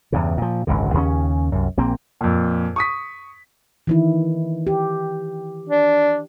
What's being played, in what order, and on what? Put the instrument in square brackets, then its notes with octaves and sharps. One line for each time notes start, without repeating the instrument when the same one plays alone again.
[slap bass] E2 G2 C#3
A#2 F3
G#1 C#2 F#2 D3
D#2 C#3 C#4
C2 F#2
A#1 A#3 C4
[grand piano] F2 A#2
C#6 D#6 B6
[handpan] D#3 E3 E4
G4
[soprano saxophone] D4